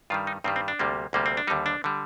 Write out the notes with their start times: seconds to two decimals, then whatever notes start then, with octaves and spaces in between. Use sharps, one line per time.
0.10 G2 D#3 G3 F4
0.27 D#4
0.44 G2 D#3 G3 C4
0.56 C4
0.68 D4
0.79 D2 C3 G3 A#3
1.13 D2 C3 G3 A#3
1.26 C4
1.37 D4
1.47 D#2 D3 G3 D#4
1.66 D4
1.84 D3 G3